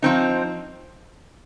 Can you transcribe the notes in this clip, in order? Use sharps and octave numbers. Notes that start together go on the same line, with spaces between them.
F3 C4 D#4